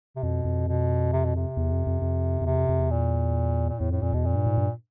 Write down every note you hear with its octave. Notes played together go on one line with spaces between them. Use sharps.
C3
F2 B2
F2
B2
C3
B2
C3
E2
F2
F2
F2
F2
E2 C3
F2
F2
E2
A#2
A#2
E2 A2
F2 A2
F2 A#2
E2 B2
F2 A#2
G2
G#2
G2